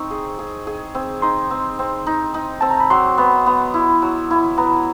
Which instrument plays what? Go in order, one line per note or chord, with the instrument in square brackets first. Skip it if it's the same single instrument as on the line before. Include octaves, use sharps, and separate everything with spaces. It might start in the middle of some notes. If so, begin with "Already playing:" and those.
Already playing: [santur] C4 D#4 [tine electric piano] C#6
[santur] G#4
G#4
G#4
C4
[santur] D#4 [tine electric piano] C6
[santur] C4
C4
D#4
D#4
[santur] C4 [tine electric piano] A5
[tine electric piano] A#5
B5
[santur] F#3 [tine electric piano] C6
[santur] B3
B3
E4
F#3
E4
[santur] B3 [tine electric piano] A#5